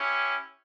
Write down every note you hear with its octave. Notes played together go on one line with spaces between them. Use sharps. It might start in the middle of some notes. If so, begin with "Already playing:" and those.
Already playing: C#4 E4 G4